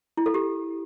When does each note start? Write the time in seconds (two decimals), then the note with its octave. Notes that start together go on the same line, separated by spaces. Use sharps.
0.17 E4
0.26 A4
0.34 G4